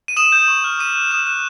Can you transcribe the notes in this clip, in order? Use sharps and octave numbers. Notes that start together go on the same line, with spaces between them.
D#7
D#6 E7
G6
C#6
F6
D6 D#7
F#6
D#6 E7
F#6 D#7